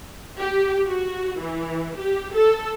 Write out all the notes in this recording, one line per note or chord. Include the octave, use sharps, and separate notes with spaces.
G4
F#4
E3
G4
A4